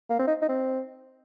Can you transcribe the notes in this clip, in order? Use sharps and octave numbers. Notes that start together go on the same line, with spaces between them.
A#3
C4
D#4
D#4
C4